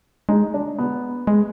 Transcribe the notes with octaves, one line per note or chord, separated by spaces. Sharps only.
G#3 D#4
D4
B3
G#3